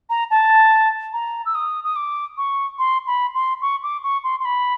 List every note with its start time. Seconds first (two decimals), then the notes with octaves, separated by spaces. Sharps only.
0.10 A#5
0.30 A5
1.13 A#5
1.46 E6
1.55 D#6
1.84 D#6
1.96 D6
2.37 C#6
2.79 C6
3.07 B5
3.34 C6
3.62 C#6
3.83 D6
4.03 C#6
4.24 C6
4.40 C6
4.45 B5